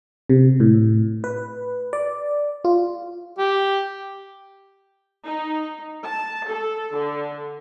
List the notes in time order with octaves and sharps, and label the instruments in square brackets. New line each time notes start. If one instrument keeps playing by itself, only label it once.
[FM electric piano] C3
A2
B4
D5
F4
[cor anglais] G4
[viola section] D#4
A5
A4
D3